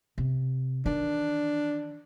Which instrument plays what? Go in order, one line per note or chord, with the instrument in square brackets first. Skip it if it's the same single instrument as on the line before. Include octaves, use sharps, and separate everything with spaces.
[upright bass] C3
[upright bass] D#3 E3 [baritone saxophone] D4